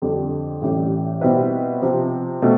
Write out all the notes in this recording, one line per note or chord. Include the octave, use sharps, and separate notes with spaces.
F2 D3 G3
A1 A2 G3
B2 G3 C4 E4 B4
C3 F3 C4
B2 A3 C4